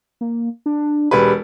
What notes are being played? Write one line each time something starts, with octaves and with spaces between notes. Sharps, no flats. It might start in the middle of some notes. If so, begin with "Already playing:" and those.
A#3
D4
E1 G4 B4